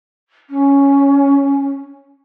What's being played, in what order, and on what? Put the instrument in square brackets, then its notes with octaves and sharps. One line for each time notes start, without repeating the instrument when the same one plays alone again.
[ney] C#4